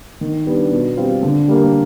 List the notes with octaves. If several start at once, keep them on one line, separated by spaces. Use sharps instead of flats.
D#3
G3 B3 D4
B2
G3 C4 F4
D3
G3 A#3